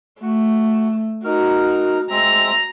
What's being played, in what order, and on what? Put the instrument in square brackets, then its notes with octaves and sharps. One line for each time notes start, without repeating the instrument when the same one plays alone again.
[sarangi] A3 [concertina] F#4
[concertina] D#4 A#4 F6 [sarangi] F#4
[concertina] G#3 C4 E5 [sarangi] A#5